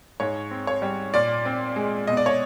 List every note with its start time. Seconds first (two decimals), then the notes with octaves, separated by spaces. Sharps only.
0.20 G#2 C#5
0.51 C4
0.67 C#5
0.82 G3
1.14 A#2 D5
1.46 C4
1.76 G#3
2.07 B2 D#5
2.17 D5
2.26 C#5